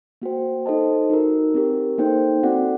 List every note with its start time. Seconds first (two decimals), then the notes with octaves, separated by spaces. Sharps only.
0.22 A#3 F#4 C5 G5
0.66 D#4 A4 C5 D#5 A5
1.10 D#4 F#4 A#4
1.54 C4 G4 A#4
1.98 A#3 D#4 A4 C5 G5
2.43 C4 F#4 A4 D5 F#5